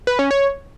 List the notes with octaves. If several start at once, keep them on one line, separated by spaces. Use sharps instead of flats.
B4
C#4
C#5